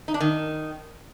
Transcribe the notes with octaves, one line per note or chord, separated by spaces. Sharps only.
D#4
D4
D#3